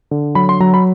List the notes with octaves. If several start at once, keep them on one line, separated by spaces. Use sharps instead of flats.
D3
F#3 B5
C6
F#3 A#5
B5